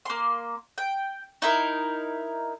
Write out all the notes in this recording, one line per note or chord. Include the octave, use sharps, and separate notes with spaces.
A#3 C6
G5
D#4 E4 A#4